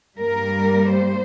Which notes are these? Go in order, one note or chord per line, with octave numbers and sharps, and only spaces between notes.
G2 G3 A#3 A#4
C5